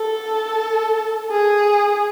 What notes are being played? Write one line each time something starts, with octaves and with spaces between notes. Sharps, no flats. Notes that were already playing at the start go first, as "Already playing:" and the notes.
Already playing: A4
G#4